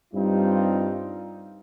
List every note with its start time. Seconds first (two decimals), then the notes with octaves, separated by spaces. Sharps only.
0.14 G2 G3 C4 D#4 F4